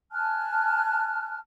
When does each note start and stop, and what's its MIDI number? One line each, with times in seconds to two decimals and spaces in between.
0.12 1.37 80
0.12 1.37 81
0.12 1.37 89
0.12 1.37 90